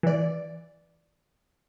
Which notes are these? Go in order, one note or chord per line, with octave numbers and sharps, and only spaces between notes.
E3 D5